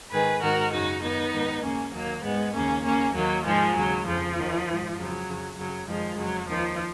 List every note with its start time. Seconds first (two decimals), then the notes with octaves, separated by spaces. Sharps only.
0.11 G#2 D#3 G#4 B4
0.42 G#2 D#3 F#4 A#4
0.72 F#2 C#3 D#4 F#4
1.02 F#2 D#3 B3 D#4
1.33 G#2 D#3
1.63 D#2 C#3 A#3 C#4
1.93 D#2 D#3 F#3 A#3
2.23 G#2 D#3 G#3 B3
2.54 D#2 C#3 A#3 C#4
2.84 D#2 C#3 A#3 C#4
3.14 D#2 D#3 F#3 A#3
3.44 G#2 D#3 F3 G#3
3.75 D#2 C#3 F#3
4.06 F2 C#3 F3
4.35 D#2 D#3
4.66 G#2 D#3
4.96 F2 C#3 F#3
5.27 F2 C#3
5.57 F#2 C#3 F#3
5.87 F#2 D#3 F3 G#3
6.17 F2 C#3 F#3
6.48 D#2 D#3 F3